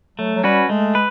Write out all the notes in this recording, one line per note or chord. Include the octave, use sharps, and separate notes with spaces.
F#3 A3
F#3
G3 C#4 F#4 B4
G#3 A3
B4